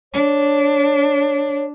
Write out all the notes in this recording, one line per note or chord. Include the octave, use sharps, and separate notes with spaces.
D4 C#5